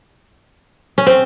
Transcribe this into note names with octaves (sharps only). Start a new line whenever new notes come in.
C#4
C4